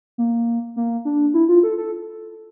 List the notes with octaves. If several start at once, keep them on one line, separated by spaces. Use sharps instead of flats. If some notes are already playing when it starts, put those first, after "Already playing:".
A#3
A#3
D4
E4
F4
A4
A4